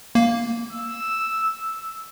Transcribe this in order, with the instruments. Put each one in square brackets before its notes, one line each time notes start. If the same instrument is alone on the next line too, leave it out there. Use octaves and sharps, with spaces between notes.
[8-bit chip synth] A#3
[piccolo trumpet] E6